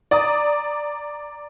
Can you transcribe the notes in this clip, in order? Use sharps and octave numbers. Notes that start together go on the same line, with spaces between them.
D5 A#5 D#6